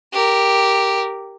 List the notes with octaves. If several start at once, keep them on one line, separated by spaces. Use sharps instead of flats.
G4 A#4